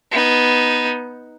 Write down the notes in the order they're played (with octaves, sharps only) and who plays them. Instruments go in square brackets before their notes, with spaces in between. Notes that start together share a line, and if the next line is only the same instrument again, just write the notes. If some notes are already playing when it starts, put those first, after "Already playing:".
[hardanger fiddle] B3 D#4